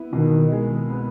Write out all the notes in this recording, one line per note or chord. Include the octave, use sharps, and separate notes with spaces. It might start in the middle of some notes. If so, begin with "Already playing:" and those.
Already playing: B3 E4
B2 D#3
G#3
B3